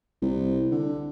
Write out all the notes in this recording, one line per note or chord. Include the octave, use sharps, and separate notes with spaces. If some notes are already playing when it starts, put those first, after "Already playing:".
C2
D3